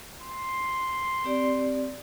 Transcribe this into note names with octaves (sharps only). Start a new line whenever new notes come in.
C6
C4 G4 D5